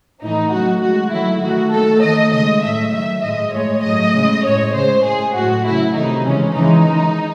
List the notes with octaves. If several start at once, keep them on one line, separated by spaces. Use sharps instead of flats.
A2 E3 A3 D#4
C#3 F#3 A3 F#4
D#3 G#3 F#4
D#3 F#3 A3 E4
D#3 A3 F#4
D#3 A3 A4
D#3 A3 D#5
C#3 G#3 D#5
A2 F#3 A3 E5
D#3 F#3 A3 E5
A2 G#3 D#5
A2 E3 G#3 C#5
A2 F#3 A3 D#5
C#3 G#3
A2 G#3 C#5
C#3 G#3 C5
A2 G#3 G#4
A2 F#3 A3 F#4
C#3 F#3 A3 E4
C3 D#3 F#3 A3 D#4
C#3 E3 G#3 C#4
C#3 E3 G#3 D#4
D#3 G#3